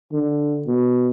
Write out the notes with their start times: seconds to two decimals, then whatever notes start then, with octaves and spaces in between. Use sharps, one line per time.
0.13 D3
0.67 B2